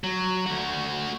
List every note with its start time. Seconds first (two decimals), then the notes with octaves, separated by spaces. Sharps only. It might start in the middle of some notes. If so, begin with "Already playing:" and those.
0.04 F#3
0.46 A3 F#4